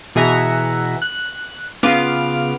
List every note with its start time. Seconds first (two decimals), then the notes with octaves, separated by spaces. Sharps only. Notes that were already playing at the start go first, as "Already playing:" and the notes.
0.15 B2 E3 G#4 E5 F#5 A#5
1.02 F#6
1.83 C#3 B3 F4 D6 F6